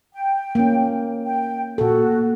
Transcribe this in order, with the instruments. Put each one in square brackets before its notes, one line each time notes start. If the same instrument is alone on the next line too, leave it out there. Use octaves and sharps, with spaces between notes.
[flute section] G5
[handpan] A#3 C#4
[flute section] G5
[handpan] A#2 A4 [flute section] F#4